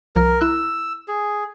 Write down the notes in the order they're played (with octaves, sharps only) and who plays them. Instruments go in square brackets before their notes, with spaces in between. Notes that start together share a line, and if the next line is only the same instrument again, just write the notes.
[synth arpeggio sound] C2 F3 F6 [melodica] A#4
[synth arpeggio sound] E4 F#6 [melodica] E6
[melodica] G#4